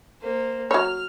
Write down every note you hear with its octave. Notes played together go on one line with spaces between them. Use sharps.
A#3 C5
F#3 C#5 F6